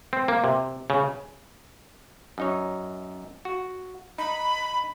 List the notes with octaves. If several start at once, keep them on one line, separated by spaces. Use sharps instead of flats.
C4
A#3
C3
C#3
F#2 D#4 C#5
F#4
D#4 B5